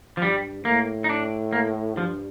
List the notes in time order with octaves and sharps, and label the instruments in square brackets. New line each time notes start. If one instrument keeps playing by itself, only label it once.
[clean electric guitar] F3
[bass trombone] G2 [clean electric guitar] G3
[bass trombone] A2 [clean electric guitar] A#3
[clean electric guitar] D#4
D4
A#3
[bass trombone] G2 [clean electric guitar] F3